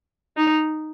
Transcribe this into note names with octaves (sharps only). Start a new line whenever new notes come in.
D#4